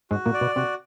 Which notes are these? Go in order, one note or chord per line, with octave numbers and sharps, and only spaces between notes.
G#2 G#3 F#4
A#2 A#3
D5
B2 B3
C3 C4 F#4